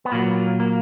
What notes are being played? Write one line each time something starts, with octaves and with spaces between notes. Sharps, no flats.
B3
A#2 F#3 A#3
A#3